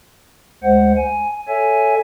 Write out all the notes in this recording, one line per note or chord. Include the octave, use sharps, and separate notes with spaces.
D2 G#3 C5 F#5
G#5
A4 C#5 E5 G#5